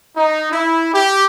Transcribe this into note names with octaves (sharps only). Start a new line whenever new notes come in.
D#4
E4
G4